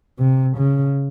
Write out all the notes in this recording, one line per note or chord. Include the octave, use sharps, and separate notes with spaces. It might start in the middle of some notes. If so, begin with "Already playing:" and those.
C3
C#3